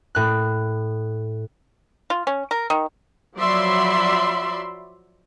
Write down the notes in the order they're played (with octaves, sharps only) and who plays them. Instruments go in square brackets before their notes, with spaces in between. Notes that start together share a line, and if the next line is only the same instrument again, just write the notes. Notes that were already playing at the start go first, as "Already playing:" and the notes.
[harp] A2 F#6
[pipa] F4
C#4
A#4
D#3
[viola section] F3 F#3 D5 E5 B5 C6